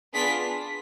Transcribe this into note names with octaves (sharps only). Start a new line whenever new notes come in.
B3 D4 F4 G#4 B6